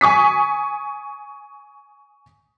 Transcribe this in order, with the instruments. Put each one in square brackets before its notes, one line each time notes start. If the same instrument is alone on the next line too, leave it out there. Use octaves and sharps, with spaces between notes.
[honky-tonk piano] G#5 C#6 D#6 B6